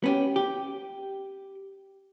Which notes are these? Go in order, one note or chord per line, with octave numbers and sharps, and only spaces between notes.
B3 C#4 G4
G4